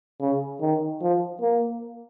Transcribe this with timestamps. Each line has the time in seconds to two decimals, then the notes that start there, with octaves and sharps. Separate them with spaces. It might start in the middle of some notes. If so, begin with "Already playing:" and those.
0.21 C#3
0.61 D#3
1.01 F3
1.41 A#3